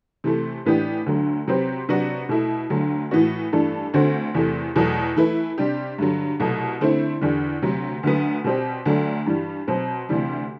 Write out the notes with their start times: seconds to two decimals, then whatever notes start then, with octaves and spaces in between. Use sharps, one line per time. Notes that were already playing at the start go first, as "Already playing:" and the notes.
0.24 C3 E3 A3
0.65 A2 E3 B3 D4 G4
1.06 D2 D3 F#3
1.48 C3 F#3 C4 G4 B4
1.89 C3 F#3 B3 D4 F#4
2.29 B2 A3 E4
2.70 D2 D3 F#3
3.11 A2 E3 B3 F#4
3.52 G2 E3 A3 D4 A4
3.93 D2 D3 A3 C4 F#4
4.34 E2 C3 E3 A3
4.76 E2 B2 F#3 A3
5.16 E3 A3 E4 B4
5.58 C3 G3 D4 G4
5.98 G2 D3 F#3
6.40 C2 B2 F#3 A3
6.81 D3 A3 C4 E4
7.21 E2 D3 G3
7.62 D2 C3 F#3
8.03 D2 D3 F#3 B3
8.44 B2 G3 C4 G4
8.85 D2 D3 F#3 A3 D4
9.26 G2 E3 G3
9.68 B2 F#3 C4
10.09 D2 C3 E3 G3